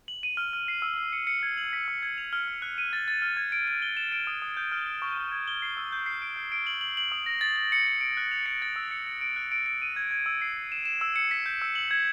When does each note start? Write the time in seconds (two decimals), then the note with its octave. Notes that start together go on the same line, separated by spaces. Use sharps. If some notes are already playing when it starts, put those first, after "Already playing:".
0.08 F#7
0.23 D#7
0.37 F6
0.53 F6
0.68 C7
0.82 E6
0.97 E6
1.13 C#7
1.27 C#7
1.43 G#6
1.57 F#7
1.73 B6
1.88 E6
2.03 G#6
2.18 F7
2.33 F6
2.48 F6
2.62 F#6
2.78 D#7
2.93 A6
3.08 A6
3.22 F6
3.37 G#6
3.52 D7
3.67 D7
3.82 G7
3.97 E7
4.12 D7
4.27 D#6
4.42 D#6
4.57 G6
4.72 F6
4.86 D7
5.02 C#6
5.17 C#6
5.32 G#6
5.48 G7
5.62 C7
5.77 E6
5.92 G6
6.06 C7
6.22 D7
6.36 G6
6.52 D7
6.67 F#7
6.81 F#7
6.97 F#7
7.12 D#6
7.26 A#6
7.41 A6
7.56 A6
7.72 C#7
7.87 C#7
8.01 D7
8.17 F#6
8.31 F7
8.46 C#7
8.62 A6
8.76 E6
8.91 C#7
9.06 C#7
9.21 D7
9.36 F#6
9.52 D7
9.66 D7
9.82 D#7
9.96 G#6
10.11 G#6
10.26 E6
10.41 C7
10.57 C7
10.72 E7
10.86 E7
11.01 E6
11.16 C#7
11.31 B6
11.46 G6
11.62 E6
11.75 F#7
11.91 G#6